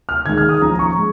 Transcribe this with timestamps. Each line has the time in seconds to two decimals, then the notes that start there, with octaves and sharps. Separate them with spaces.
0.09 F6
0.26 D#3 G#3 D#4 G#6
0.38 F6
0.49 D#6
0.61 F3 C#4 A#5
0.74 A#5
0.79 C#6
0.97 G#3